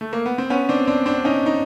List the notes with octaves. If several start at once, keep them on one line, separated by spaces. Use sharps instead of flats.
A3
A#3
B3
C4
B3 C#4
C4 D4
C4 D4
C4 D4
C#4 D#4
D#4